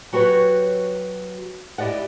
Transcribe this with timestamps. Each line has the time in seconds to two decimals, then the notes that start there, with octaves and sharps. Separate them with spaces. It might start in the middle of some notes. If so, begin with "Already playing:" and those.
0.13 F#3 F#4 G4 A#4 B4 C#5
1.78 E4 G4 D5 D#5 F#5